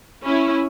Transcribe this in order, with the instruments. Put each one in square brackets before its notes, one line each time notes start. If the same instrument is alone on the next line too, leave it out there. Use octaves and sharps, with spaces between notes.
[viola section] C#4 E4